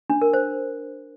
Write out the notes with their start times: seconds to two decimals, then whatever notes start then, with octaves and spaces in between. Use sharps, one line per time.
0.10 D4
0.22 A#4
0.33 C5